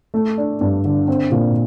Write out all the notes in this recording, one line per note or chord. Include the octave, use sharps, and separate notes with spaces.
A3
D4
G2
D3
C4
A#2